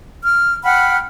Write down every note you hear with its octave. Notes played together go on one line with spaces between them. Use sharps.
F6
F#5 G5 B5 F6